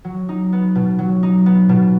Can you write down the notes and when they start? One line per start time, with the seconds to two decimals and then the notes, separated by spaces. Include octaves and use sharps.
0.04 F#3
0.29 D#4
0.53 B3
0.75 B2
0.99 F#3
1.23 D#4
1.46 B3
1.69 B2